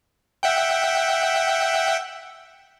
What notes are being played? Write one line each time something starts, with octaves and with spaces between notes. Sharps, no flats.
E5 F#5 G5